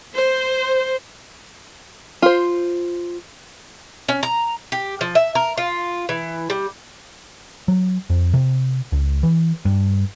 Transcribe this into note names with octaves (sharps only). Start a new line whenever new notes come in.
C5
F4 C5
C#4
A#5
G4
F3
E5
A#4
F4
E3
G3
F#3
F2
C3
C#2
E3
G2